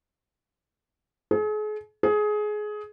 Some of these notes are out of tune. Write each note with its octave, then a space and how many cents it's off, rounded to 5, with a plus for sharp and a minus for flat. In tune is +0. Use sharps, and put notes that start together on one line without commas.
G#4 +40
G#4 +20